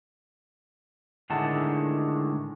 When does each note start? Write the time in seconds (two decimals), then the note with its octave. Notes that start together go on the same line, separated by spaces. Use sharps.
1.30 A2 D3 D#3 G#3 F#5 A5